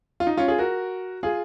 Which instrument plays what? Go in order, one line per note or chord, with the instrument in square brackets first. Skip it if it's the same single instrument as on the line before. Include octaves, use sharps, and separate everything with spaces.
[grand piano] F4
D#4
C#4 F4
F4 G#4
F#4 A#4
F4 G#4